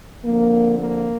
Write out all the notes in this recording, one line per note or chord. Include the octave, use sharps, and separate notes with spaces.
F2 D3 F3 A#3
A#3